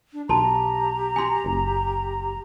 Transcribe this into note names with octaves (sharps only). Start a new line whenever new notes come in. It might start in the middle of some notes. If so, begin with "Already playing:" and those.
D4
B1 G4 A5 A#5 C6
G#5 C6
F#1